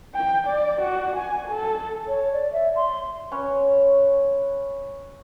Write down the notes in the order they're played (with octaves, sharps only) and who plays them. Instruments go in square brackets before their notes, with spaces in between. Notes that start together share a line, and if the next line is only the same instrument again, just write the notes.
[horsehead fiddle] G5
D5
F#4
G#5
A4
[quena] C#5
D5
E5
C6
[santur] C#4 B4 C#5